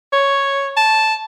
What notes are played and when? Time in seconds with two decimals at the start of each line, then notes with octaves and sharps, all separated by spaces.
0.12 C#5
0.77 A5